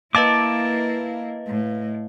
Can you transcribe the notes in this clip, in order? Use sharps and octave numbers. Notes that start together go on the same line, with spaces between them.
A#3 E4 B4 D#5 F5 A5 D6
A2